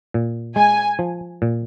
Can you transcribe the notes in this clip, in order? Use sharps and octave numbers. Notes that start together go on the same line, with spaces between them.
A#2
G#3 G#5
F3
A#2